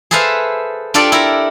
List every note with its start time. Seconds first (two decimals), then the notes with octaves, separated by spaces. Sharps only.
0.11 G#4 A4 B4 C5 E5 F5
0.94 D4 F4 G4 A4 D5
1.12 E4 A4 A#4